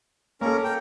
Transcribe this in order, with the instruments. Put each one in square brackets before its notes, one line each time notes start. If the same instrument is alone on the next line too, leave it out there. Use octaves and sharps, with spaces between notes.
[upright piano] A#3 A4 [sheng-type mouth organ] C#4 A#4
[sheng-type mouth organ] G5